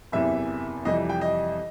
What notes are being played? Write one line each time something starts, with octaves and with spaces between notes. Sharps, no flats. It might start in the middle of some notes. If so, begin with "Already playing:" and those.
F#1 E2 C3 E3 E5
F2 C3 E3 G3 D#5
G5
D#5